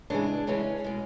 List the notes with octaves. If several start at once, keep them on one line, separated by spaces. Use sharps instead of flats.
C#3 E3 G#3 D4
C#3 E3 G#3 C#4
B2 G#3